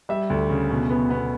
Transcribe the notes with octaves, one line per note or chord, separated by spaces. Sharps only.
G3 E5
D2
C#3
B2
B3
B3